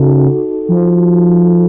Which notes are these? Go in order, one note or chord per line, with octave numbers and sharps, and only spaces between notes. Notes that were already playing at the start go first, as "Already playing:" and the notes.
Already playing: C#3 D#4 F#4 A4
F3